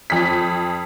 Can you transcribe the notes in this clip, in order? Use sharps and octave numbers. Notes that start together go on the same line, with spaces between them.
F2 B6